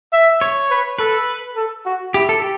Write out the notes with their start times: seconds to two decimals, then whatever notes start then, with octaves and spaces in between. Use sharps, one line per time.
0.12 E5
0.41 C#5
0.70 B4
0.99 A4 B4
1.56 A4
1.86 F#4
2.14 E4 G4
2.29 A4
2.42 G4